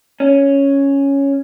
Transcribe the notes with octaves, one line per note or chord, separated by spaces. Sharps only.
C#4